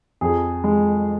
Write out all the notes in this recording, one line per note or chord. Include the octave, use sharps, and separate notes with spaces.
F2 G#4
G#3